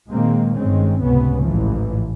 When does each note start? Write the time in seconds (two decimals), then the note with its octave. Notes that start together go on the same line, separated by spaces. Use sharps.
0.10 A#2 D#3 G#3 A#3 C4
0.54 G1 G2 D#3 G#3 C4 C#4
1.00 G1 C#2 A2 C3 B3 C#4
1.44 A1 G#2 E3 F3